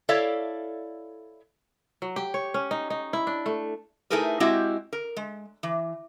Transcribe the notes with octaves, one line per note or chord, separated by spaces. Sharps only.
E4 A4 C#5 D5 E5 F5
F#3
G4
C#5
C#4
D#4
D#4
E4
D4
A3
A3 D#4 E4 G#4 A#4 B4
G#3 C4 E4 F#4 G4 D#5
A#4
G#3
E3